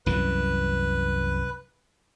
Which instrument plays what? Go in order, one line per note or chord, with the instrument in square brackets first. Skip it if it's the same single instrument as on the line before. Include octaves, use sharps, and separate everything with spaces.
[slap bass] C2 F#2 E3 [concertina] B4